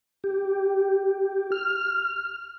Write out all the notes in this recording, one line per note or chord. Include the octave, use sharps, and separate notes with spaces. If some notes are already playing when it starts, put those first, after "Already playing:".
G4
F6